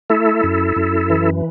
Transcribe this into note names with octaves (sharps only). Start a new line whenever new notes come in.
A3 E4 A4
F#2
F#2
E3